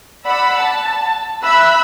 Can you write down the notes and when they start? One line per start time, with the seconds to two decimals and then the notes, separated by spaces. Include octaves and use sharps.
0.24 D5 F#5 B5 E6
0.59 A5
1.44 E5 B5 E6 F#6